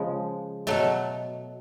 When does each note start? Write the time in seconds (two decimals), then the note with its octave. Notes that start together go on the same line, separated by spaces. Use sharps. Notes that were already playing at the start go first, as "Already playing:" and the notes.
Already playing: C#3 F3 G#3
0.67 B2 F#3 A3 A4